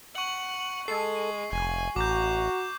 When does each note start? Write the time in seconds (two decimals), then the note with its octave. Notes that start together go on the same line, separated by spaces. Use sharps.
0.15 F#5 C#6 F#7
0.88 G#3 A4 C7
1.52 F1 G#5
1.96 A1 F#4 A#5 D6 G6